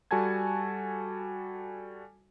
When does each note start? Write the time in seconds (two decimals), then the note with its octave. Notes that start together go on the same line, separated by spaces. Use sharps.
0.11 G3 F#4 A4 G#5 A5 G#6